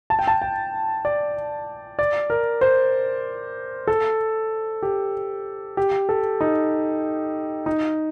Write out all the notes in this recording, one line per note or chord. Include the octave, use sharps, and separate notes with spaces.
A5
G5
A5
G5
D5
D5
A#4
C5
A4
G4
G4
A4
D#4
D#4